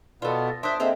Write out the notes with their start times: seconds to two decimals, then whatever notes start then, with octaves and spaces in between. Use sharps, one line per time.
0.22 B2 B3 F4 A4 D5
0.48 A6 A#6
0.63 D4 C5 E5 C6 D#6 F#6
0.80 A#3 C4 G#4 A4 C5 D#5 E5 F7